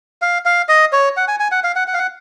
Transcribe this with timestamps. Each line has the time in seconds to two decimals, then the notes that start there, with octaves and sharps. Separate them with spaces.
0.22 F5
0.45 F5
0.69 D#5
0.92 C#5
1.17 F#5
1.28 G#5
1.40 G#5
1.52 F#5
1.64 F5
1.76 F#5
1.88 F#5
1.94 F5
1.98 F#5